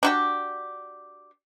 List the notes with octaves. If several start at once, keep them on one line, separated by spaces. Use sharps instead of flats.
D4 F#4 G4